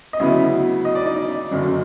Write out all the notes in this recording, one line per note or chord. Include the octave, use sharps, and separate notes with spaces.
D#5
D2 C#3 F#3 B3 E4 E5
D#5
D5
D#4 D#5
F#1 F#2 D3 F#3